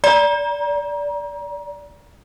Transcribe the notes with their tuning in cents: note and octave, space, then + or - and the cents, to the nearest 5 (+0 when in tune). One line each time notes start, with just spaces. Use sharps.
D5 -15 A#5 +30